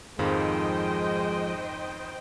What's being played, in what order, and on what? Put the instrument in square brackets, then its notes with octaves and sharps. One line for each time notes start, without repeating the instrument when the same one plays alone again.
[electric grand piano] F2 G#2 D#3 [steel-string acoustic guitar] F3 [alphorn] G#3 [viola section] C5 D#5 G5